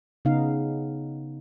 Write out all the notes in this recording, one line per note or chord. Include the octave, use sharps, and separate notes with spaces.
C#3 B3 D#4 F5